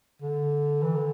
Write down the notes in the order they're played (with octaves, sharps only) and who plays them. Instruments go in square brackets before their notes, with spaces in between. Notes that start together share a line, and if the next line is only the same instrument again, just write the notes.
[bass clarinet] D3
E3
D3